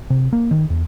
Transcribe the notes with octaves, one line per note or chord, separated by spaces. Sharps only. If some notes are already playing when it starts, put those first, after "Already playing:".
C3
A#3
D#3
E2